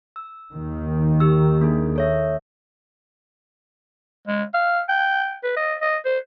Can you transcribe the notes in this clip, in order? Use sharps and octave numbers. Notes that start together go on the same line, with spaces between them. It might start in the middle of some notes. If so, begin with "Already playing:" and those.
E6
D#2 D#3
G4 E6
A#3 D4 G#4
A4 C#5 E5
G#3
F5
G5
B4
D#5
D#5
C5